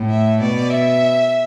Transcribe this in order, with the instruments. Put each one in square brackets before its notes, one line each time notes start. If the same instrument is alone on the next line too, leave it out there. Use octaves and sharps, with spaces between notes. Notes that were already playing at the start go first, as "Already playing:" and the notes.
Already playing: [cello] A2
[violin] E5
[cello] B2 [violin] D5
[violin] E5